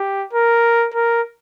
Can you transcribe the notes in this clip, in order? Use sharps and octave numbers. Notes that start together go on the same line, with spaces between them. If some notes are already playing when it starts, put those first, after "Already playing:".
Already playing: G4
A#4
A#4